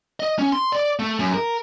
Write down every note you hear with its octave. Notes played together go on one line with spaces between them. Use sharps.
D#5
C#4
C6
D5
A3
F#2
A#4